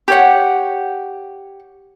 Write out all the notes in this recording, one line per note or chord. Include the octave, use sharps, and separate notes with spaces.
G4 C#5 F#5